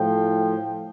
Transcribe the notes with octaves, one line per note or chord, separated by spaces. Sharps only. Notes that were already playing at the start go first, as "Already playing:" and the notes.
Already playing: A2 F3 G5